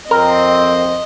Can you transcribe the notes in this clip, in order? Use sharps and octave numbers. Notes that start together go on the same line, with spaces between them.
F2 C4 A#4 D#5